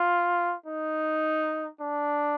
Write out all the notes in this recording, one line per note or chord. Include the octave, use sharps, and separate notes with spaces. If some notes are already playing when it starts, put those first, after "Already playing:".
Already playing: F4
D#4
D4